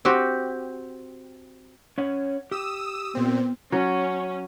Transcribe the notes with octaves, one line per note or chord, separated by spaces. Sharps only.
C4 F#4 G4
C#4 C#5 F#5
G4 D#6 E6 E7
A#2 B3 C4
F#3 C#4